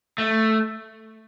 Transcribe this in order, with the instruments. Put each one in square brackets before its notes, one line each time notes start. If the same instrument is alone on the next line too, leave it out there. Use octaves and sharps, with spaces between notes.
[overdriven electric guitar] A3